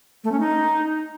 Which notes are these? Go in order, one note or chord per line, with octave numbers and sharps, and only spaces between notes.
A3
C#4
D#4